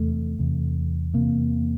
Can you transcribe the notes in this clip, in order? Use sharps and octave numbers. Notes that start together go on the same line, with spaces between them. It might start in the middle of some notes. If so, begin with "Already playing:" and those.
Already playing: E2 C3 A3
E2 C3
E2 C3 A#3